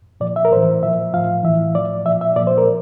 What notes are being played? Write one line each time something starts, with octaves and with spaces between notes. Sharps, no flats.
A#2 F3 D5
E5
A#4
A2 E3 C5
A#2 F3 E5
A2 F3 F5
A2 E3 E5
A2 F3 D5
A#2 F3 E5
E5
A#2 F3 D5
C5
A#4